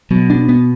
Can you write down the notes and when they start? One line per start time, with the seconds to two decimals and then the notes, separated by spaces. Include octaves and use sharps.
0.10 B2 F#3
0.30 D4
0.49 B3